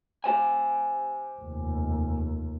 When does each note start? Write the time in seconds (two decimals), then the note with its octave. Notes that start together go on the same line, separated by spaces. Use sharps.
0.24 G4 C5 G#5
1.39 F1 D#2